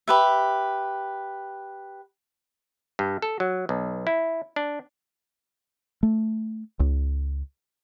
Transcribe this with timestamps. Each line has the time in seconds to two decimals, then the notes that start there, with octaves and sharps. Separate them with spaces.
0.08 G4 B4 E5
2.99 G2
3.22 A4
3.40 F#3
3.69 B1
4.07 E4
4.56 D4
6.03 A3
6.80 C#2